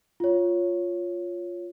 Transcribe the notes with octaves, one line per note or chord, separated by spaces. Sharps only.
F4 C#5